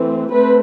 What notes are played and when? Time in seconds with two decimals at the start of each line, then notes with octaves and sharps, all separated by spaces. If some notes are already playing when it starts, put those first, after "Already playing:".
Already playing: E3 A3 C4
0.32 A3 C4 B4